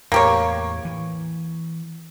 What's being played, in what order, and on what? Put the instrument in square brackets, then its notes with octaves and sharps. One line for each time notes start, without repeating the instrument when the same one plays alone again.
[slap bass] E2 A2 [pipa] A#3 G4 C#5
[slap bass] E3